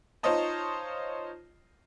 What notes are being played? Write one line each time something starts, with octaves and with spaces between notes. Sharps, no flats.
D#4 F4 C5 C#5 D#5 A5